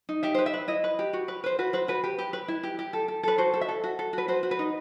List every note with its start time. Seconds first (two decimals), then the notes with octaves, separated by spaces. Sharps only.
0.09 D#4
0.23 G4 E5
0.34 B4 C5
0.46 E5
0.54 B4
0.68 E4 D#5
0.84 B4
0.99 G4
1.13 F#4
1.28 B4
1.44 B4 C5
1.59 F#4 B4
1.73 B4 C5
1.88 F#4 B4
2.03 G4 B4
2.18 G4
2.33 B4
2.48 E4
2.63 G4
2.79 G4
2.93 A4
3.08 A4
3.23 A4 B4
3.38 F#4 C5
3.54 A4
3.61 E5
3.69 A4
3.84 F#4
3.99 A4
4.13 F#4 B4
4.28 F#4 C5
4.43 F#4
4.51 B4
4.59 D#4